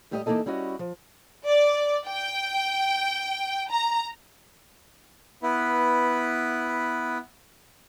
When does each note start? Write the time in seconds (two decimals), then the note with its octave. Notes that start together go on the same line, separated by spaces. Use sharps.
0.11 A2 G3 A3 G4 G#4 D#5
0.26 E3 A#3 D#4 E4 A4 D#5
0.46 G3 C#4 E4 F#4 D#5
0.79 F3
1.47 D5
2.06 G5
3.71 A#5
5.43 B3 E4 B4